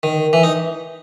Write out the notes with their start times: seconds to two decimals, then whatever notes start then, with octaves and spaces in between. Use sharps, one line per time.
0.03 D#3
0.33 E3
0.43 D#4